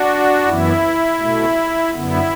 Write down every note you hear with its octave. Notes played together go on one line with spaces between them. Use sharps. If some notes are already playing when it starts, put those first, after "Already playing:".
Already playing: D4 F#4
F#2 E3 B3 E4
B2 A3
F#2 D3 B3 E4